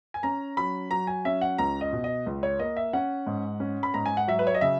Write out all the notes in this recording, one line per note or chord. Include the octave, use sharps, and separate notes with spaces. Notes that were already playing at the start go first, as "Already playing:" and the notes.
G#5
C#4 A#5
F#3 B5
F#3 A#5
G#5
C#4 E5
F#5
C#2 A#5
D#5
B2
D#5
C#2
C#5
A#3 D#5
E5
C#4 F#5
G#2
C#4
B5
G#2 A#5
G#5
F#5
F#3 E5
B4
C#5
D#5
C#3 E5